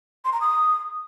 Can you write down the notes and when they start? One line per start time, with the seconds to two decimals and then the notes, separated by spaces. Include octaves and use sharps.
0.25 C6
0.33 A#5
0.41 D#6